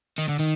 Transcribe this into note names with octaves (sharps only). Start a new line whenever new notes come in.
D#3
D3
D#3